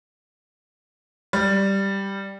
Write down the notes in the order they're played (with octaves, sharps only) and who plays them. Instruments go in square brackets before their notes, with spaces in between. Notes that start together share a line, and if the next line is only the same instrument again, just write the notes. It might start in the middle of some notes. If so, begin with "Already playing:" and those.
[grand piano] G3